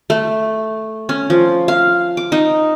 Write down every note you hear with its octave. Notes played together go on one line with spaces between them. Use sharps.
A3
C#4
F3
F5
D6
D#4